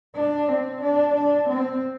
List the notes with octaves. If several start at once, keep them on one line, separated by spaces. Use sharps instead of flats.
D4
C4
D4
D4
C4